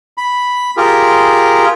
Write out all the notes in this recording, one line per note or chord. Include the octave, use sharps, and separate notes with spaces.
B5
F4 G4 G#4 A#4